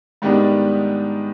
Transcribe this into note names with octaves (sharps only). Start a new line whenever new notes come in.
G#2 D#3 G3 B3 D4